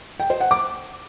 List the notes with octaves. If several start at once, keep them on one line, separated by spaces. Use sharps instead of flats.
G5
C5
F#5
D6